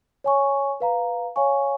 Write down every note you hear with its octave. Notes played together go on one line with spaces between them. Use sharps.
C#5 G#5 C#6
B4 F5 A#5
C#5 F5 G#5 C#6